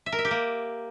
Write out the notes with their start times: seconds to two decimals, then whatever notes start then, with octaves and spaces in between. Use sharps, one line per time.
0.06 E5
0.12 A#4
0.19 E5
0.25 G4
0.31 A#3